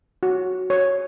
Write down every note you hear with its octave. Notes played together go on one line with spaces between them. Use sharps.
F#4
C#5